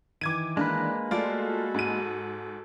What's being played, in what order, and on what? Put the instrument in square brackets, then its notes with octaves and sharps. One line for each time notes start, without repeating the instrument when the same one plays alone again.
[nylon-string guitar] D#3 E3 [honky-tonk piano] D6 G#6 D#7
[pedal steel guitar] G#3 A#3 B4 [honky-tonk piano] D4
[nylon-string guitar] A3 D5 [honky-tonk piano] F4 [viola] F#4 A4
[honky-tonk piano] G#2 D#7